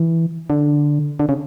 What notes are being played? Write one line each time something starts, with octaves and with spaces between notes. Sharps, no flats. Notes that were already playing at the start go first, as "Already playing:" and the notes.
Already playing: E3
D3
D3
C#3